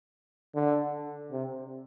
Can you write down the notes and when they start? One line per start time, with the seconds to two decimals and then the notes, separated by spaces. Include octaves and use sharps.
0.55 D3
1.32 C3